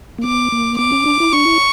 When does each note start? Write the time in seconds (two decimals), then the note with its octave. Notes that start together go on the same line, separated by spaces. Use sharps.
0.18 A#3
0.24 B3 D6
0.52 A#3
0.78 B3 D6
0.92 C#4
1.05 D4
1.20 E4
1.33 D4 C#6
1.46 E4